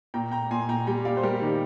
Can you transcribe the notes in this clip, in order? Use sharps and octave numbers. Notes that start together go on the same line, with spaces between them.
A#2 G5 A#5
A#2 G5 A#5
A#2 G#5 C6
A#2 G5 A#5
G3 G5 A#5
A#2 D5 F5
C5
G3 G4 A#4
D#3